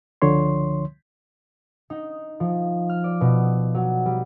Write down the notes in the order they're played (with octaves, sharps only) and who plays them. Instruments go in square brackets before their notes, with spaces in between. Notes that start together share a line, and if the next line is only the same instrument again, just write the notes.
[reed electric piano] C#2 D3 F3 C#5 C6
[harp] D#4
F3
F6
D5
B2
F#3
G3